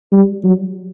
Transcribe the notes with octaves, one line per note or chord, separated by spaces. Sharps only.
G3
F#3